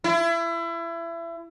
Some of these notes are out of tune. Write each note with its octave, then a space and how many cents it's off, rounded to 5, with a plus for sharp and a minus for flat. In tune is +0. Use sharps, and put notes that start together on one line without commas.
E4 +30